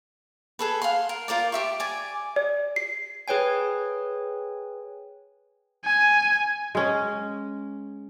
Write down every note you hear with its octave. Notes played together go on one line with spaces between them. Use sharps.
G#4 A4 B4
F5 F#5 C6
A#4
F4 A#4 C5 D5
G4 E5 C#6
D5 G#5
D5
C7
G#4 B4 C#5 G5 G#5
G#5
G#3 C#4